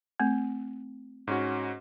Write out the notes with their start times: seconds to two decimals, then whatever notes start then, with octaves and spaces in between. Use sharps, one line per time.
0.20 A3 C4
1.27 G#2 C#4 F#4